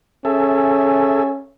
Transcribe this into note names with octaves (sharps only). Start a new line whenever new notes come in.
C#4 G#4 A4 E5